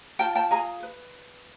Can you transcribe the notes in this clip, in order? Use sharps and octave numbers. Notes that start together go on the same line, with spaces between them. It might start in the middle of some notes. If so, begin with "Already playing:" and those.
F4 G5 A5
G5 A5
G#4 G#5 A#5
B4